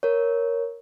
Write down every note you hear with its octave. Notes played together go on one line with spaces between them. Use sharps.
A#4 C#5